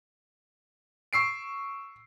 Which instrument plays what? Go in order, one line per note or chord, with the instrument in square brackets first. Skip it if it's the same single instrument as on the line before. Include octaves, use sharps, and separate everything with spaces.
[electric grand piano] C#6 E6 C7 D7